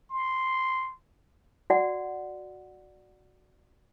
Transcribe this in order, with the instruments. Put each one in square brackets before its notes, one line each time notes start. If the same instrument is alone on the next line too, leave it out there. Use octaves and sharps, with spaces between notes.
[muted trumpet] C6
[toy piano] F#4 D5 F#5